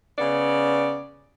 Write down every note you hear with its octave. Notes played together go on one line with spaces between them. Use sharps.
C#3 B3 D5